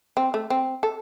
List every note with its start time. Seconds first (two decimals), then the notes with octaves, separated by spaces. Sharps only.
0.17 C4
0.34 A3
0.50 C4
0.83 A4